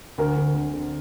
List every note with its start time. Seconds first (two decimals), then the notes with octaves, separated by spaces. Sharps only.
0.18 D2 A#4
0.36 D3
0.54 D2
0.73 D3